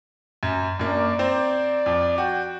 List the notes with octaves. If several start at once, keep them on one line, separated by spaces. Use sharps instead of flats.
F#2
F#2 A#3 D4 D5
C4 C5 A#5
F2
F#4 G5